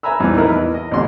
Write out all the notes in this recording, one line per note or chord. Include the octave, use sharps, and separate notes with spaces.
B4 E5 G#5 A#5 B5 E6
A#1 E2 G2 D#4
D#4 E4 A#4 B4
E2
D#5
A1 B2 D3 G4 C6